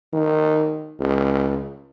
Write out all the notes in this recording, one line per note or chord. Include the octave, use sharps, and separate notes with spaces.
D#3
C#2